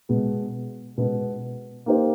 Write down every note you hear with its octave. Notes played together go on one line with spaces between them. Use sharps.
B2 G#3 B3
B2 G#3 B3
A#3 D#4 G4 C5